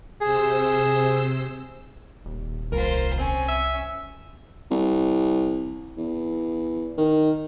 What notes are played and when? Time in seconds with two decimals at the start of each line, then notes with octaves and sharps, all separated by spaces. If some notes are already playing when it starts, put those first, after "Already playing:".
0.21 C3 G#4 C5 E6
2.25 D#1
2.72 C2 F4 A#4 C5
3.19 C4 C#4 G#5
3.49 E5
4.71 C2
5.97 E2
6.98 D#3